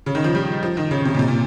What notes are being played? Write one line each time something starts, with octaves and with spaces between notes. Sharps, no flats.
C#3
D#3
F3
G3
F3
D#3
C#3
C3
A#2
C3
A#2